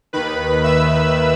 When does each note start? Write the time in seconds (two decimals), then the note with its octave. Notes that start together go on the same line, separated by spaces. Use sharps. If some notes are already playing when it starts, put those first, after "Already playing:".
0.13 D#2 D#3 B4 B5
0.64 E5 E6